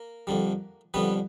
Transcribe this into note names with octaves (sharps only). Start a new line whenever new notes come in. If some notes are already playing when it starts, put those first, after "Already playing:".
Already playing: A#3 A#4
F2 D3 G3
F2 D3 G3 B3 B4